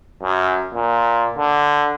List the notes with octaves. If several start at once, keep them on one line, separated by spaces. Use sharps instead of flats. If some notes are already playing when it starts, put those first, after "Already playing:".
F#2
A#2
D3